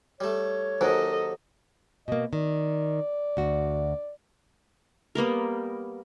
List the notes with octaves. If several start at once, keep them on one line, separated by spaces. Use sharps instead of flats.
G3 A3 C#5
D#2 D#3 F#3 A4 C5 D#5 G#5
B2 A#3 D#5
D#3 D5
D2 F#4
G3 A#3 B3 A#4